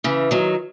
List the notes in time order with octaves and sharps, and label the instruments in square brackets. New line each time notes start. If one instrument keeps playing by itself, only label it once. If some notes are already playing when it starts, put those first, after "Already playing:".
[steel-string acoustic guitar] C#3 E3
D#3 F#3